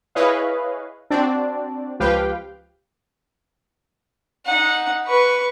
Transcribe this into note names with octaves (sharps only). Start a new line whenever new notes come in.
E4 G#4 B4 C#5 D#5 F5
C4 D4 F#4 D5
C#2 F3 G4 B4 F5 G5
D#4 F#5
B4 C#6